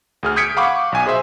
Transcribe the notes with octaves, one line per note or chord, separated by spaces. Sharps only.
D2 G#4 F6
D#6 G6 G#6 B6 C#7 D7
F5 F#5 B5 C#6 D6
B1 G#5
G#4 C5 E5